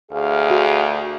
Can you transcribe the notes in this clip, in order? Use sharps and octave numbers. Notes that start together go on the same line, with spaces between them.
D2 G#4 F5
F#4